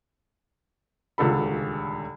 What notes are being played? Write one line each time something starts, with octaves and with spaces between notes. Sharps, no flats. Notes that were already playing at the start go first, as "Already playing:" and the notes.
D#1 C#2 D3 A4 B5